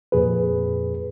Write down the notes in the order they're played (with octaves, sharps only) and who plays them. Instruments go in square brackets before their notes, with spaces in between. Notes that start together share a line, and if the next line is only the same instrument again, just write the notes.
[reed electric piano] F2 A#2 G#4 B4